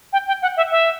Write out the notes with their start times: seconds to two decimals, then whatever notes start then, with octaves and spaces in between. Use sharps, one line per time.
0.13 G5
0.27 G5
0.42 F#5
0.57 E5
0.71 E5